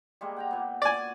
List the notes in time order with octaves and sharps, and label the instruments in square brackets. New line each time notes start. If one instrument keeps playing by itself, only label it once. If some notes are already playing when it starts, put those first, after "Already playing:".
[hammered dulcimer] G3 G#3 A#3
F#5 G5 A#5
A#2 B3
[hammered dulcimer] F#4 [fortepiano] D5 G#5